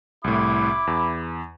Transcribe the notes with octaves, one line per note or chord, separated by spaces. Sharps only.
C2 A2 E4 B5 D6
E2